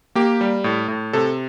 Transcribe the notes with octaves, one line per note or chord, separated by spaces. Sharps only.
A#3 G4
G3
A2
A2
C3 A4